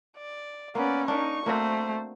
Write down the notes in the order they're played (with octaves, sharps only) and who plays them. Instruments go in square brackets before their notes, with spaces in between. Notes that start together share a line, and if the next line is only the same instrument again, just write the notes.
[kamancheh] D5
[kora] A#3 [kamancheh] B3 D5 [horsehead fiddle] C#4
[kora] A#3 D4 [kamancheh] D#4 C#6
[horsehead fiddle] A3 [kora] A#3 C4 F#4 [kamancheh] C5